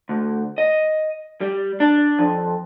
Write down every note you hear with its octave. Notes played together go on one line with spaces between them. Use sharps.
D2
D#5
G3
D4
F2